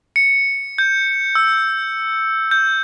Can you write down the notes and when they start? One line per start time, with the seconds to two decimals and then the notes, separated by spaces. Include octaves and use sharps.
0.16 C#7
0.78 G6
1.35 E6
2.51 G6